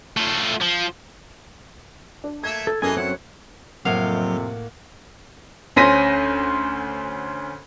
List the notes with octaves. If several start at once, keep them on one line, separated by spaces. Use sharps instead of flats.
A3 F4
F3
D4
A3 A#3 E5 G#6
A4
F#2 E3 G#4 A4 D#5 G#5
F#3 C4 E4 F#5
F2 A2 C3 F#3 A#3 F5 F#5
D2 C#4 C5 A#6 B6 D#7